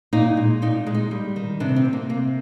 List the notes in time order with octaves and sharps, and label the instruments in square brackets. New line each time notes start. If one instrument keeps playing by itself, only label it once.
[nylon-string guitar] A#2 D#4
G#3
A#2 D#4
G#3
D#4
G3
D#3
C3 D4
C4
C3
A#3
C3 A#3